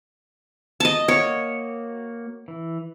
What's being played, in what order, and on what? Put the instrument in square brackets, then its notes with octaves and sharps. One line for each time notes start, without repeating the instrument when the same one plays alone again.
[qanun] D#5 A5
[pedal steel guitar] A#3 F#4 [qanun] C#5
[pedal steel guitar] E3